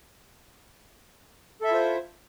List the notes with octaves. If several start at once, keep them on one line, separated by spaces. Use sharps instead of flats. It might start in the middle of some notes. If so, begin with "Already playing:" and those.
E4 F4 A4 C5 E5